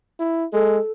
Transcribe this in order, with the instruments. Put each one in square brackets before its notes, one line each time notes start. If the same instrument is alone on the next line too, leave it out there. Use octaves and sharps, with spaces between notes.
[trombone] E4
[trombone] G#3 [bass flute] A4